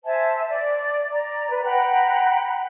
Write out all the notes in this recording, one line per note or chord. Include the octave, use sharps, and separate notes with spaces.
C5 E5 G#5 A5
D5
D5 A#5
B4
F#5 G5 A#5 B5